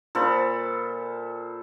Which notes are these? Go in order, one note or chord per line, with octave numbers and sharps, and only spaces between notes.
A#2 A4 C5 B5